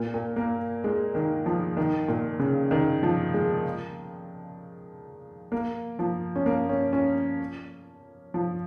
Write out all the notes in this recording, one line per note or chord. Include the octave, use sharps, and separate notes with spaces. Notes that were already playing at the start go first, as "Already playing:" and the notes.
Already playing: A#2
A#2
A#3
G#3
D#3
F3
D#3
A#2
C#3
D#3
F3
G#3
A#3
F3
C#4
A#3
C#4
C#4
F3